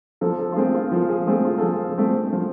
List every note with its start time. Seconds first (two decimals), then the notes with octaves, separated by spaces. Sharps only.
0.21 F3 A4
0.39 A4
0.52 F4
0.56 A3 C4 G#4
0.74 F4
0.92 F3 F4
1.09 G#4
1.27 A3 C4 G#4
1.45 F4
1.58 A4
1.62 F3 G#4
1.97 A3 C4
2.33 F3